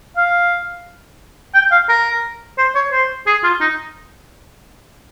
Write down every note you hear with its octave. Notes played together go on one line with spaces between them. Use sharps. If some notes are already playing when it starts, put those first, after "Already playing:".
F5
G5
F5
A#4
C5
C#5
C5
G#4
F4
D#4